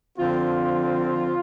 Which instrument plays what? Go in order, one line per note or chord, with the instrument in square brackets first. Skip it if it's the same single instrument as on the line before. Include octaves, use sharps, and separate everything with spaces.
[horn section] D3 F3 C4 F4